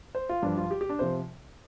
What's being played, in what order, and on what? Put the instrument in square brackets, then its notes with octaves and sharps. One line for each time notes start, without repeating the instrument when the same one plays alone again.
[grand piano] C5
F4
G2 F3 D4
F4
G4
G4
D4
C3 F3 C5